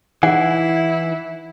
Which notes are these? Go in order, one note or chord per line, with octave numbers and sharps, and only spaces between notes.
E3 D#4 E4 E5 F#5